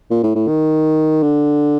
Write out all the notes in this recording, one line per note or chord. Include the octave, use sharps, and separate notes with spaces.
A#2
A2
A2
D#3
D3